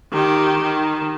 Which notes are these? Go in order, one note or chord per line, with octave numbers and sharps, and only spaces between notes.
D#3 G4
D#3